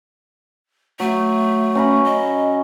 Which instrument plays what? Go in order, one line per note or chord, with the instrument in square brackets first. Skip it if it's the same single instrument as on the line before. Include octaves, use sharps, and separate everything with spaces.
[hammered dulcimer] F#3 [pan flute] A3
[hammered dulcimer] C#4 A#5 B5
[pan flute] D#5